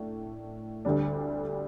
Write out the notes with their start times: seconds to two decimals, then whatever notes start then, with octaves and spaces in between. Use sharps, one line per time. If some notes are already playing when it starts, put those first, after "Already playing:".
Already playing: A2 A3 D4
0.85 D2 D3 G3 D4